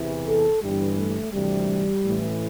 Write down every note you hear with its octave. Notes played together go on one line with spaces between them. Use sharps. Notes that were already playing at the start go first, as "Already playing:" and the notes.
Already playing: E2 C3 E3
A4
G1 G2 E3 G3
A3
D2 C3 E3 G3
A1 A2 E3